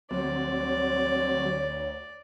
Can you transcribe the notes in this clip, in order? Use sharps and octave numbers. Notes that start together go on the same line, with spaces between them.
D2 F#3 C4 C#5 D5